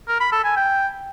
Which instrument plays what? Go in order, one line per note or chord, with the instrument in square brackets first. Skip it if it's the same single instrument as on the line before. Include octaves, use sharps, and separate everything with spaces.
[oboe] A#4
B5
A4
G#5
G5